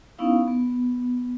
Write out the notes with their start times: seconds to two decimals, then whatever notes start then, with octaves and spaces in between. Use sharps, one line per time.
0.19 B3 C#4 D#4 E4 F5
0.48 B3